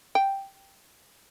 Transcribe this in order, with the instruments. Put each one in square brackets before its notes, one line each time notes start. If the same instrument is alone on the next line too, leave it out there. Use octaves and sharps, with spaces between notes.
[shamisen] G5